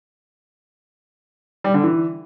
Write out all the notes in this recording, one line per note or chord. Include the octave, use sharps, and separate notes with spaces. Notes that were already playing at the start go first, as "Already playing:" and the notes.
G3
D3
E3